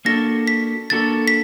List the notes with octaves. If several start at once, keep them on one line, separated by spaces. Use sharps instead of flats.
A#3 D4 F#4 A4 A#6
B6
A#3 D4 F#4 A4 A6
B6